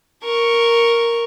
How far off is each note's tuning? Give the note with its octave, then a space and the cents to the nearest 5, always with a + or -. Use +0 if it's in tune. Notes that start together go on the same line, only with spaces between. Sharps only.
A#4 +0 C#6 +0